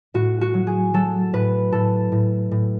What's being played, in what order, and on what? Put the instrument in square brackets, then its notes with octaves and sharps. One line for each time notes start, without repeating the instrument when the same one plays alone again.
[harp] A2 F#4
F#4
F#3
G#4
F#3 A4
A2 B4
A2 A4
A2
A2